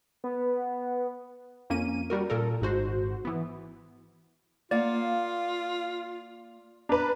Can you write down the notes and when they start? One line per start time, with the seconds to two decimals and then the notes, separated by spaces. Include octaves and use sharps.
0.24 B3
1.70 F2 A#3 C#4 D#7
2.10 G3 F#4 A#4
2.30 A#2 A4 A#4
2.61 G#1 G#2 F#4 C5
3.25 E3 B3
4.71 A#3 F4 D5 F5 F#5
6.89 D4 B4 A#5